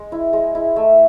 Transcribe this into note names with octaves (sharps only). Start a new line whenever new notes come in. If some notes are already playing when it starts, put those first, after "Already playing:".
Already playing: G#3
E4
G#3
E4
A3 E5